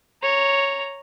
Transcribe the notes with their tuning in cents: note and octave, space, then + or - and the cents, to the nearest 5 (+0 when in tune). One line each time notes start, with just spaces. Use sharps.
C#5 +0 A#5 -5